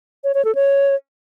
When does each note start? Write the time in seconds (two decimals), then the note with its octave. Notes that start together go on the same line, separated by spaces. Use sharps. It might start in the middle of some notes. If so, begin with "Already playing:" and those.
0.24 C#5
0.34 C#5
0.45 A4
0.55 C#5